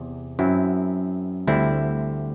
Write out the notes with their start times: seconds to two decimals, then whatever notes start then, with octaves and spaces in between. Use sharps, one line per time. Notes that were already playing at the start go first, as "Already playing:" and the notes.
Already playing: E2 C3
0.39 F#2 F#3 C4 E4
1.47 D2 D3 G3 C4 E4